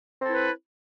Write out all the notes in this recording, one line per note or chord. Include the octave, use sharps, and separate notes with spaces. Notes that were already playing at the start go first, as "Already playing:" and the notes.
C4 E4 A4 B4